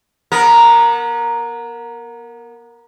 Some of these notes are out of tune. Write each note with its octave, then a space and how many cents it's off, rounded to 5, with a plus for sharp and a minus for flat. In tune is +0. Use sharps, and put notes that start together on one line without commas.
B3 -35 A#4 +0